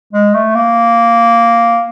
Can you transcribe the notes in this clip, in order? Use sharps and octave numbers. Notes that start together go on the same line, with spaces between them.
G#3
A3
A#3